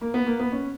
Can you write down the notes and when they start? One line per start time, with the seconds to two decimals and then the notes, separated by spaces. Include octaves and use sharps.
0.01 A#3
0.14 B3
0.26 A#3
0.40 B3
0.52 C#4